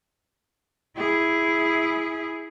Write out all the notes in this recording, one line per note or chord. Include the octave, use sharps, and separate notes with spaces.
E4 G#4